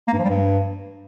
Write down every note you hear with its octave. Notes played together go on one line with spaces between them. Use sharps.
A#3
G2
F3
G3
G2